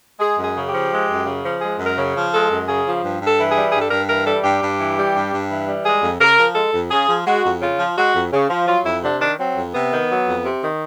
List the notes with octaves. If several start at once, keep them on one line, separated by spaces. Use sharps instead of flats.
G#3 G#4
F#2
G#4
C#3
G4
F3
G#3
F#2
C#3
F3
G#3 G#4
F#2
A#4
C#3
F3
G#3 A4
F#2
C#3 G#4
F3
G2
G2
A4
E3
G#4
G3
G2 G#4
A4
G2 A#4
E3 A#4
G3 A4
G2 G4
G2
E3
G3
G2
G2
E3
G3
G#3 G#4
F2
C#3 A#4
F3
G#3 A4
F2
C#3 G#4
F3
G#3 F#4
F2
C#3 F4
F3
G#3 F#4
F2
C#3
F3
F#3 F4
F2 E4
C3 D4
D#3 D4
F#3 C4
F2
C3 B3
D#3
F#3
F2
C3
D#3